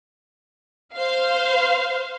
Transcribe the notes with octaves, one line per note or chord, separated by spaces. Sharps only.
C5 F5